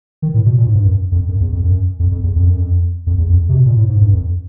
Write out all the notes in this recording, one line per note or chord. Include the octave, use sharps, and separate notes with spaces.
D#3
A2
B2
A#2
G#2
G2
F#2
F2
F#2
E2
F2
F#2
F2
F2
E2
F2
F#2
F2
F2
E2
F2
C3
B2
A#2
A2
G#2
G2
F2